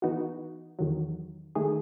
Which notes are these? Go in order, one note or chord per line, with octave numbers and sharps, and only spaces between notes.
E3 B3 D#4 F#4
E2 D#3 F#3
D#3 A3 D#4 G#4